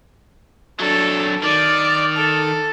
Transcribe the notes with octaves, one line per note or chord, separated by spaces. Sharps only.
F#3 D4 A4
D#3 D5
A4